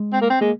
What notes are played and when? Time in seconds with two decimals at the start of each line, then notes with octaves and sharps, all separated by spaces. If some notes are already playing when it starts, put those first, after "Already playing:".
Already playing: G#3
0.13 C4
0.21 A#3
0.30 C4
0.41 G#3 A#3